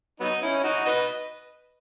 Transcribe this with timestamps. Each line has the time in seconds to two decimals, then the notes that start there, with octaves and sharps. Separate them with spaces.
0.20 F#3 B3 D#4
0.42 C#4 E4
0.64 D#4 F#4
0.86 B4 D#5